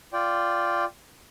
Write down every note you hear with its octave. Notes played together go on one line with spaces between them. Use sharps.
F4 D5 G5